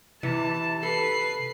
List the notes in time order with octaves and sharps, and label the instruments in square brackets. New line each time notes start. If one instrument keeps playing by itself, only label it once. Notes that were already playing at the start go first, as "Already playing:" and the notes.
[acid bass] C3 [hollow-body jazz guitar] E3 [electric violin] A5
[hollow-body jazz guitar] A4 [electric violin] B4 C7